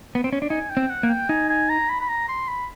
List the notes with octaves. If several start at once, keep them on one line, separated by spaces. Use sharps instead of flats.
B3
C4
C#4
D4
D#4 G#5
G5
C4
F#5
A#3
G5
D#4 G#5
G#5
A#5
B5
B5
A#5
C6
B5